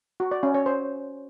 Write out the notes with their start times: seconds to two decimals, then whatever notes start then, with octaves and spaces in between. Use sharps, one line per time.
0.20 F#4
0.31 D5
0.43 C#4
0.54 C#5
0.66 C5